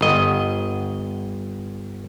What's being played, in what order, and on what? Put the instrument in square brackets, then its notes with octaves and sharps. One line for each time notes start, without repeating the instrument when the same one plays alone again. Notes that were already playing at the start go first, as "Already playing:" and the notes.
[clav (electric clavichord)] G1 D#5